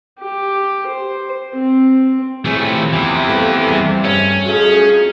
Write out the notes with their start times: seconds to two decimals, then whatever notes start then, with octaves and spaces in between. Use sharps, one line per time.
0.20 G4
0.86 C5
1.54 C4
2.45 C3 E3 A3 F4 G#4 C#5
2.93 E2 E3
3.28 A3 A#3
3.68 G3 G#4
4.04 G2 C#4
4.45 F#3 A3 D#4 F4 G#4